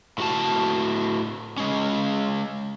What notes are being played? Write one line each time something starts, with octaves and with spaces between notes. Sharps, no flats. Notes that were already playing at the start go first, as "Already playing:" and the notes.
A2 F#4 A5
G#3 C#4